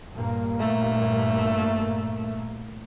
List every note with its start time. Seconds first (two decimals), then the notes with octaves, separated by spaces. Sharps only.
0.14 G2 A#2 A#3
0.60 A3